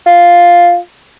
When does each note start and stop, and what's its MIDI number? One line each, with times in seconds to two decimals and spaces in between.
0.06 0.76 65